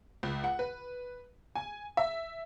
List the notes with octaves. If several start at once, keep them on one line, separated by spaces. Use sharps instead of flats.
C#2
F#5
B4
G#5
E5